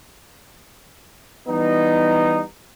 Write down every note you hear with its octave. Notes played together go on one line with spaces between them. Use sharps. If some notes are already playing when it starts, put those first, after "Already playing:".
E3 G3 B3 D#4